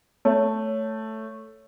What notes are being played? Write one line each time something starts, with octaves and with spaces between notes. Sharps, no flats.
A3 C#5